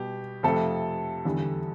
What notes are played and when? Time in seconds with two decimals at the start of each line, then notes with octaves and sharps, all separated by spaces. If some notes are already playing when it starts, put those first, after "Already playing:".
Already playing: B2 G3 G4
0.43 F2 C3 F3 A3 A4
1.25 E2 D3 G3